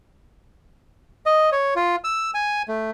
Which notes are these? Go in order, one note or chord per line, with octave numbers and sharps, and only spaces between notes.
D#5
C#5
F4
E6
G#5
A3